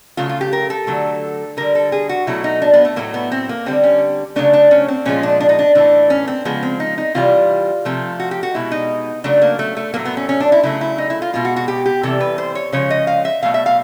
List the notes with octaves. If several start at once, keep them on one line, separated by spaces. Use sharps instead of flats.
C#3 F#3 A3 F4
F4
G4
A#4
A4
D3 F#3 A3
D3 G3 A#4
A4
G#4
F#4
B2 F#3 A3 E4
D#4
D4
B3
A3
A2 F#3 A3 A#3
B3
C4
A#3
D3 G3 C4
C#4
C#3 F#3 A3 D4
D4
C#4
C4
A#2 F3 G#3 C#4
D4
D4
D#4
D4
A2 E3 A3 D4
C#4
C4
C#3 F3 G#3 B3
C4
D#4
D#4
C3 E3 G3 F4
C3 F3 A3
F#4
G4
F#4
B2 G#3 E4
D#4
C#3 F#3 A3 D4
A#3
A3
A3
A2 F#3 A3 A#3
B3
C#4
C#4
D4
E4
C#3 F#3 A3 E4
E4
D#4
E4
F4
B2 G#3 F4
F#4
F#4
G4
G4
C3 E3 G3 A4
B4
C5
C#5
C#3 F3 G#3 C#5
D#5
F5
E5
B2 F#3 A3 F5
E5
F5